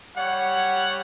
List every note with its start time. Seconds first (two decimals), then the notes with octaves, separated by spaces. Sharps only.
0.16 G3 C#5 F#5